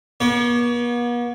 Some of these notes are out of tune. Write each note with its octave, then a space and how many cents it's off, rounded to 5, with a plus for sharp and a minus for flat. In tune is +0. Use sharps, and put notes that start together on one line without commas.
B3 -45 C#5 +35